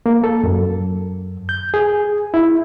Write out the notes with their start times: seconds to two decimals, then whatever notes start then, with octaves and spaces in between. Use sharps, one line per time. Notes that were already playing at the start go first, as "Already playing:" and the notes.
0.06 A#3
0.24 A4
0.44 F#2
1.49 G6
1.74 G#4
2.34 E4